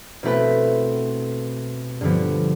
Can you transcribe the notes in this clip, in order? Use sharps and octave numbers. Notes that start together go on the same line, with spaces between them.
B2 A3 C4 E4 B4
G2 D3 F3 B3